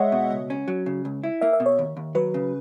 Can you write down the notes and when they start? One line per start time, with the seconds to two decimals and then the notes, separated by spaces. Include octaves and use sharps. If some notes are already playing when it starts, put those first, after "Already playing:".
Already playing: G#3 C#5 D#5 E5 F#5
0.12 B2
0.31 C#2
0.50 C#4
0.68 F#3
0.86 C#3
1.05 C#2
1.23 E4
1.41 A#3 E5
1.53 E5
1.60 B2
1.66 C#5
1.79 D#2
1.97 D#2
2.15 F#3 B4
2.34 C#3